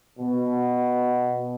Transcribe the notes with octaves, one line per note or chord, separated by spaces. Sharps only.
B2